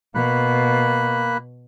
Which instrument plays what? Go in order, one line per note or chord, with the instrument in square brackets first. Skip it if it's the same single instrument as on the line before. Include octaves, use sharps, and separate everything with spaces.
[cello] B2 [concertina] A#3 B5 F#6